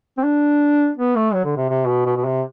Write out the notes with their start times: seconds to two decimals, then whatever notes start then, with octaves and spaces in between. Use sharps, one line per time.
0.17 C4
0.24 D4
0.97 B3
1.16 A3
1.34 F#3
1.45 D3
1.57 C3
1.70 C3
1.88 B2
2.06 B2
2.16 B2
2.25 C3